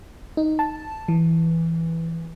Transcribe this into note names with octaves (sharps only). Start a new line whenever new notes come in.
D#4
A5
E3